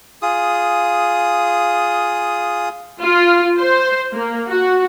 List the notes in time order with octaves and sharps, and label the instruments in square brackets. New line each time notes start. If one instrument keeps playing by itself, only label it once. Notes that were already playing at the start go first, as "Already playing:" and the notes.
[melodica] F4 G#4 D#6
[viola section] F4
C5
A#3
F#4